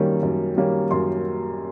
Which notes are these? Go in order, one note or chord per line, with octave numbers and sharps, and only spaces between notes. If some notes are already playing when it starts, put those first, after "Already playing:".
Already playing: F#2 D#3 G3 A#3 C#4
F#2
D#3 G3 A#3 C#4
F#2 C6